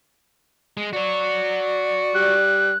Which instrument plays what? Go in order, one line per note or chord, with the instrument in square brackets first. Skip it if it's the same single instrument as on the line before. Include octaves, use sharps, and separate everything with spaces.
[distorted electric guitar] G#3
[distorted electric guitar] F#4 C#5 [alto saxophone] D5
[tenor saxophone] G3 [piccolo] F#6